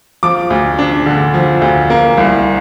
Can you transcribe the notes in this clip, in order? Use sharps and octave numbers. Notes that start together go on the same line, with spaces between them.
F3 D6
D2
D4
D3
F3
D2
A#3
C2